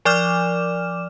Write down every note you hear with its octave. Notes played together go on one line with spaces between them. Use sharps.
F3 D5 D6 F6 E7